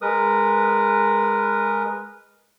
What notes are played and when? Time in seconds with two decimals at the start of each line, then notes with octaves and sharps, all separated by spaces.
0.02 G#3 A#4 B4 D#6